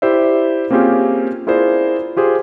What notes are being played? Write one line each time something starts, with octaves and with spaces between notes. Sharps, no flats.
E4 G4 C5 D5 E5
A#3 C4 C#4 F4 G4 G#4
E4 F4 G#4 A#4 C5 D5
F4 G4 G#4 C5